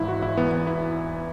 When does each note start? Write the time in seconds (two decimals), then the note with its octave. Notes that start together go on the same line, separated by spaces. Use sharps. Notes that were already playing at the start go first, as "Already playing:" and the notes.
Already playing: G#1 G#2 E3 E4
0.08 F#4
0.22 E4
0.37 E2 E3 B3
0.52 B3
0.67 E4